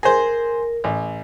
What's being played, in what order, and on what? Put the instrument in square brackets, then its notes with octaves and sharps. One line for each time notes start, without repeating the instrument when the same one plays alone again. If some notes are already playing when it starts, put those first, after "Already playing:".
[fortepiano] G#4 C5 [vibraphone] A#4
[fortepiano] A1